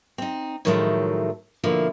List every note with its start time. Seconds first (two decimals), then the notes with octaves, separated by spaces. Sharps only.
0.18 C4 D#4
0.65 A2 D#3 F3 F#3 G#3 A3
1.64 B2 D3 F3 A#3 E4